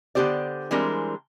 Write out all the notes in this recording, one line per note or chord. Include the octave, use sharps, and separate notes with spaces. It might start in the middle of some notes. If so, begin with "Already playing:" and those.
D3 B3 D4 G4 C5 D5
E3 G3 G#3 C4 D4 A#4